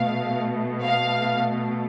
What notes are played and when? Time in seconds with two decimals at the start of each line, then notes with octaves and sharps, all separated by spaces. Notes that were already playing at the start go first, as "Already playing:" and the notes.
Already playing: B2 A3 F5
0.83 F5